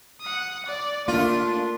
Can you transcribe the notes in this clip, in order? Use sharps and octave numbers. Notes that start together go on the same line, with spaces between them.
F#5 D#6
D5
A3 A#3 D4 F4